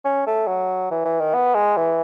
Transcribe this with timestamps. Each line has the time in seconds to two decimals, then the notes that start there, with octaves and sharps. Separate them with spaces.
0.05 C#4
0.27 A3
0.47 F#3
0.91 E3
1.05 E3
1.20 D#3
1.34 B3
1.55 G#3
1.77 E3